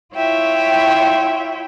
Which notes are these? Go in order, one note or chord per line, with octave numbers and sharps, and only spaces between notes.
E4 F4 C#5 E5 G5